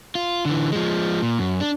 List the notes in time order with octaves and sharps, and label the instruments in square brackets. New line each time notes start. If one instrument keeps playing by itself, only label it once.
[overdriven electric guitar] F4
D3 E3
F3 G#3
A#2
F#2
D4